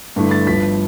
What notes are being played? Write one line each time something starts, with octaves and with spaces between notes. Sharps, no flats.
G2 D3 A3 E4
A6
G1 G2 F3 B6